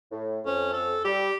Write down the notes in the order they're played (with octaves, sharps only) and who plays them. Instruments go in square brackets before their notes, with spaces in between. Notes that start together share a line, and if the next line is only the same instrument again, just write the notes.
[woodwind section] A2
[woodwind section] F2 [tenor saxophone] C#4
[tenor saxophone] A4
[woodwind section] G3 [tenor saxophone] G4